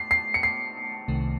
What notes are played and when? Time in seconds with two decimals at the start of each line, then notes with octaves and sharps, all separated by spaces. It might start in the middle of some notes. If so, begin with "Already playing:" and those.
Already playing: C7
0.11 C7
0.34 C#7
0.43 C7
1.08 C2 C3 D#3 A3